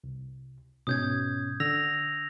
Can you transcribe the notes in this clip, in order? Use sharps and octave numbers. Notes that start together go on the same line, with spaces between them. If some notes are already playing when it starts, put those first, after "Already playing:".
C2
G#2 B2 C#4 D#6 G6 G#6
D3 E6 A#6 F7